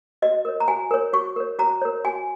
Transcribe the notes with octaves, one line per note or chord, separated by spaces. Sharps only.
F#4 D#5
A#4 C#5
A#5
F#4 G#5
A#4 C#5
F#4 C#6
A#4 C#5
F#4 A#5
A#4 C#5
F#4 G#5